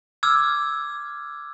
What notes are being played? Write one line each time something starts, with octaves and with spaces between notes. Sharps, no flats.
D6 E6 F6 G#6